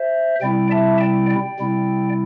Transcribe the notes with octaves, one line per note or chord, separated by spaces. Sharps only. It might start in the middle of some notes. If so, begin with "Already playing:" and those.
Already playing: C5 E5
C3 G3 C4 E4 D5 G5
E5 A5
D5 G5
D5 G5
C3 G3 C4 E4